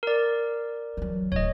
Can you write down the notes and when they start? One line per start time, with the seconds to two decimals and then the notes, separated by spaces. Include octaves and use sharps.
0.03 A#4 D5
0.97 E3 F#3
1.32 D1 E3 C#5 D#5